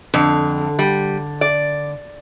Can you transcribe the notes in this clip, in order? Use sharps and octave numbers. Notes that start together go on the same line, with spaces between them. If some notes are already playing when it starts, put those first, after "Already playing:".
F2 D3
G3
D5